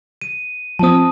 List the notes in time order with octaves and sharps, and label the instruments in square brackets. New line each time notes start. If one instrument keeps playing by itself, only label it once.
[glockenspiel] D#7
[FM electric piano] F3 C4 [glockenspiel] A5 D#6